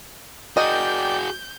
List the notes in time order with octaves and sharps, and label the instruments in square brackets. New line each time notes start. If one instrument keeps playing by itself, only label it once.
[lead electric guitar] F#4 G#4 [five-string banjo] A#4 D#5 [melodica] D5 G5 [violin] G6